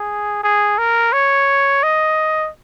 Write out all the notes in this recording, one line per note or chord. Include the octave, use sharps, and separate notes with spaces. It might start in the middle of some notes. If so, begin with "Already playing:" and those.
Already playing: G#4
G#4
A#4
C#5
D#5